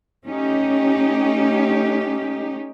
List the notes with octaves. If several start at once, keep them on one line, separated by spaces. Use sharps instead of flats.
A3 C#4 D#4 G4